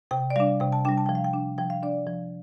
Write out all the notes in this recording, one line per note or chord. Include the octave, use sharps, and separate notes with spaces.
C3 G5
D5
G3 D4 F5
C3 G5
A5
G3 D4 G5
A5
F3 G5
F5
G5
D4
F3 G5
F5
D4 D5
F3